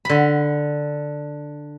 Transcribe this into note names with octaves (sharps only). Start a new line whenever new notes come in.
D3 B5